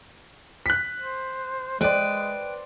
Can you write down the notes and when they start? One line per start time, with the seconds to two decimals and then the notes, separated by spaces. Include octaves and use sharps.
0.66 F#6 B6
1.00 C5
1.81 G#3 B4 C5 D5 G5